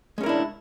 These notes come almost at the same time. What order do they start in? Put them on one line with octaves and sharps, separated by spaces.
G#3 C#4 A#4 E4 D4